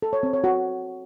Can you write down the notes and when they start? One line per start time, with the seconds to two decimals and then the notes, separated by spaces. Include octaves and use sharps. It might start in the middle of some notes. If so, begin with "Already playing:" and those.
0.02 A4
0.13 C#5
0.23 C4
0.33 C#5
0.44 F#4